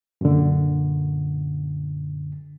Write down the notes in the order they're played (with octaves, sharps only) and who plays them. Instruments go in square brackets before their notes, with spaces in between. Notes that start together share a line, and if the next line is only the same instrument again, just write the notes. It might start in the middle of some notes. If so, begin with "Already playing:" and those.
[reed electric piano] F#2 A#2 D3